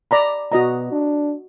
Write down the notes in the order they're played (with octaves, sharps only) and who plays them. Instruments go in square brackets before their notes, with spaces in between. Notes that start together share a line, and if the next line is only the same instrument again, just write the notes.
[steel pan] D5 A#5 B5
[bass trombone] B2 [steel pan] F#4 D#5 A#5
[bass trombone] D4